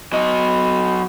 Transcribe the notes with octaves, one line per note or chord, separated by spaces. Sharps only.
F#3 D#5